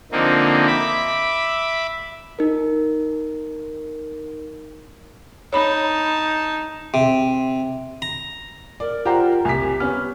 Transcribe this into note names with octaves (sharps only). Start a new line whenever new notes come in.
D3 F3 A#3 C4 D#4
E5 B5 D6
D#4 A#4
D#4 C#5 A5 B5
C3
A#5
A#4 D5
F4 G4 C5 D5 F#5 A#5
C2 G4 G#5 B6
B3 C#4 F6